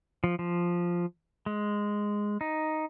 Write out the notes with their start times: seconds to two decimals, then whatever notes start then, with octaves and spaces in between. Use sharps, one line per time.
0.24 F3
0.39 F3
1.46 G#3
2.41 D#4